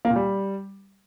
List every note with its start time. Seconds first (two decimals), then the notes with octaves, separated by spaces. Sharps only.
0.05 A#3
0.10 A#2
0.16 G3